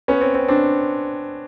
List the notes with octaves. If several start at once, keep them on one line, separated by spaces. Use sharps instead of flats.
B3 C#4
C4
C4
C4 D4